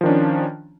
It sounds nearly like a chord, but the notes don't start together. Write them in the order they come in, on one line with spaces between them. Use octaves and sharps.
F3 D#3 D4 C#4